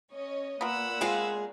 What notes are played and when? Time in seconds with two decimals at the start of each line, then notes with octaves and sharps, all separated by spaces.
0.12 C#4 C#5 D#5
0.61 A#2 A#3 B3 F4 A#4 F#5 B5 E6
1.01 G#3 C4 F4 G#4 F5